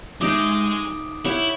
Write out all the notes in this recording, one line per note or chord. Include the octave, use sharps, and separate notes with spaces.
G#3 D#4 G4 D#5 E5 D6 D#6 D7
E4 G4 C#5 F#5